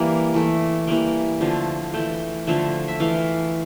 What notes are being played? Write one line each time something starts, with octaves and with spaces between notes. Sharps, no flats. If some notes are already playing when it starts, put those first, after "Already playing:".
Already playing: E3 G3 A#3
E3 A3
E3 G3 A#3 G5
D3 F3 A3
E3 A3 G5
D3 F3 A3
E5
E3 A3 F5